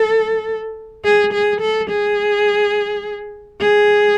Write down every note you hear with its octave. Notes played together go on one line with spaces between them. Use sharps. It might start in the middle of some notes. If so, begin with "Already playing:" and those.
Already playing: A4
G#4
G#4
A4
G#4
G#4